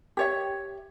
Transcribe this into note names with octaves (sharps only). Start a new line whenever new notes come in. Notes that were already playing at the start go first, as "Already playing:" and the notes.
G4 C#5 E5